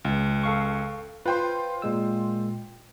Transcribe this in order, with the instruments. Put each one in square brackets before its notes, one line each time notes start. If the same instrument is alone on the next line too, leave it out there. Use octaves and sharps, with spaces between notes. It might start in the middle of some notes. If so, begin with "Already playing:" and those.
[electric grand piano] C#2
[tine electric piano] A4 F5 C#6
[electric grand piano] F4 G5 C6 [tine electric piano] B4 C5
[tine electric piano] A#2 G#3 E6